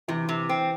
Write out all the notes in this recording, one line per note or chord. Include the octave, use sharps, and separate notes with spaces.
C3 E3
C3
C4